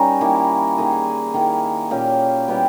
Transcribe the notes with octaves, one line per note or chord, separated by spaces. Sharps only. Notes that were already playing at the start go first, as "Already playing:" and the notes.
Already playing: G3 C#4 D#4 A#4
D#3 A#3 E4
D#3 A#3 D#4 G#4
D#3 A#3 E4
A#2 A#3 C#4 G4
G3 B3 E4 G4